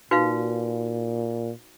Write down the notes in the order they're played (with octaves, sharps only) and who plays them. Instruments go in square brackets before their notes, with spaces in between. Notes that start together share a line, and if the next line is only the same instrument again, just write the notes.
[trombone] A#2 [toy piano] D#4 F#4 B4 F5